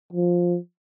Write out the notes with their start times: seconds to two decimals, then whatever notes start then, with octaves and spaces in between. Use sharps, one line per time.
0.13 F3